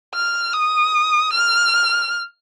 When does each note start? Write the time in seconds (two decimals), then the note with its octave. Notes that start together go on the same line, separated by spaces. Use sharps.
0.14 F6
0.53 D#6
1.33 F6